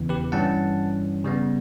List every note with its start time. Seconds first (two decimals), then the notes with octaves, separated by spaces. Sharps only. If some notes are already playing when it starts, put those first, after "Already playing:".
Already playing: E2 C#3 E3
0.09 G4 B4
0.32 G2 E3 G3 C#4 F#5 A5
1.24 C#3 G3 B3